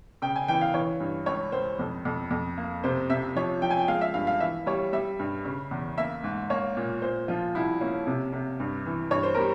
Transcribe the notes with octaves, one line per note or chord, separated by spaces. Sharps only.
C#3 G5
G#5
E3 G5
F5
E3 C#5
G2
C#2 C#5
C#2 C5
F2
F2
F2
A#3
C3 C5
C3 E5
F3 C#5
F3 G5
G#5
G5
G#3 F5
E5
G2 F5
F5
E3 E5
G3 C#5
G3 E5
G2
C#3
E2
A#3 E5
G#2
A#3 C#5
A#2
A#2 C5
F3 F4
C2 E4
A#3 C#4
C3
C3
G2
E3
G2 C#5
C5
G3 A#4